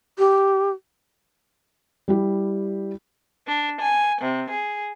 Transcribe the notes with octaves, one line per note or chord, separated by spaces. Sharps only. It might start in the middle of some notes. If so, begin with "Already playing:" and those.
G4
G3 E4 G4
D4
G#5
C3
G#4